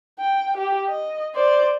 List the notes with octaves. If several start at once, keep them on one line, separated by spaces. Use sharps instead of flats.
G5
G4
D#5
C5 D5